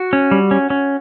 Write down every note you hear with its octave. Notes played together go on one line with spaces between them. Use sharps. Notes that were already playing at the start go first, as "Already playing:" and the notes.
Already playing: F#4
C#4
G3
C#4
C#4